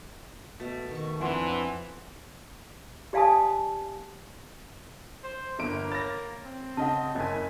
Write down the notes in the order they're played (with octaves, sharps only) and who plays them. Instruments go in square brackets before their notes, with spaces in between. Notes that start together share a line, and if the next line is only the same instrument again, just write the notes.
[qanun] B2 [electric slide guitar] A3
[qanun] D#3 C#6
[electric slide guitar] F2 D4 [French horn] E3 [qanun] C4 F4 [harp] F#5 C6 E7
[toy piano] G4 D5 F5 G#5 A5 D#6
[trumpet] C5
[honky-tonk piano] G1 D7 [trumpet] A#3
[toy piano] C#5 B5 [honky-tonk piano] A6 A#6
[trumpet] C4
[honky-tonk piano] C#3 D#5 [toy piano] F#5 A5
[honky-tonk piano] F#1 G#5 [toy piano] D#5